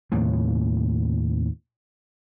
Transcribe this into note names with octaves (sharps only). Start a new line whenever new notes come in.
D#2 A2 C3 F3